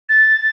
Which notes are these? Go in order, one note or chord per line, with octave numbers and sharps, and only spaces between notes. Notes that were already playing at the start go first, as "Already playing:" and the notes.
A6